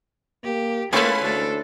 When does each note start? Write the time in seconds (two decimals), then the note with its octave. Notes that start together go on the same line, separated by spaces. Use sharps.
0.44 A#3 G4
0.93 G#3 A#3 C#4 E4 F4 A4 B4
1.21 D2 D4 A4